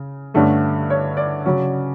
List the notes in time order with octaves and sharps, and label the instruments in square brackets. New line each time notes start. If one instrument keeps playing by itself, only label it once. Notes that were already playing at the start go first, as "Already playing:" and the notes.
Already playing: [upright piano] C#3
G2 D3 A3 C#4
C#5
D5
C#3 F#3 C#4